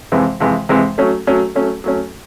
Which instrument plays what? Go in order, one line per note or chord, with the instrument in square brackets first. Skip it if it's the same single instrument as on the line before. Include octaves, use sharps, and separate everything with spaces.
[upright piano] F2 C3 E3 G#3
F2 C3 E3 G#3
F2 C3 E3 G#3
F#3 A3 C#4
F#3 A3 C#4
F#3 A3 C#4
F#3 A3 C#4